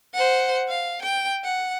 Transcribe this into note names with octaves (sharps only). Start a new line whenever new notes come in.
C5 F#5
F5
G5
F#5